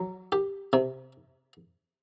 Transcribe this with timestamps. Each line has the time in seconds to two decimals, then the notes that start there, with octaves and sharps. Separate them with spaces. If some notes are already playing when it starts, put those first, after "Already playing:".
Already playing: F#3
0.32 G4
0.73 C3